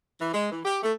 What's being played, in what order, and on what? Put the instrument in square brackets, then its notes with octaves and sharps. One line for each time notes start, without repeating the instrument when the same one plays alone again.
[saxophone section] E3
G#3
E3
G4
A3